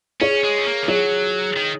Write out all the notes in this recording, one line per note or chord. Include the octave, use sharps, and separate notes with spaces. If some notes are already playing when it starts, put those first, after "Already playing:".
C#4 G#4 C#5
G#3
C#4
A#3
D#3
F#3 G#4 C#5
D#3